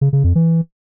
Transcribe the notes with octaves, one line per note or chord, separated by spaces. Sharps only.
C#3
C#3
F2
E3